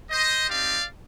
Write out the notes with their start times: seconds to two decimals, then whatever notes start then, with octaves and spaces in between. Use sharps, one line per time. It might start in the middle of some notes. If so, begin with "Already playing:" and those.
0.11 C5 D#5
0.50 C4 D#4 G4 D5 F5